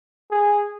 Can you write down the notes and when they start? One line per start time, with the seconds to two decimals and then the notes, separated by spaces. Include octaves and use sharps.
0.31 G#4